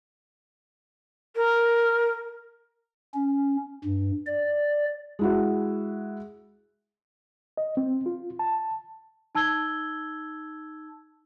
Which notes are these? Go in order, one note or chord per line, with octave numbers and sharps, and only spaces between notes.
A#4
C#4
G2
D5
G#3 E4 F#4
D#5
C4
F4
A5
D#4 A5 E6 G#6 G7